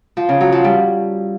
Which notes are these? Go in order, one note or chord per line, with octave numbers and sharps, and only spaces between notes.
F3
C#3
F#3
F3
G3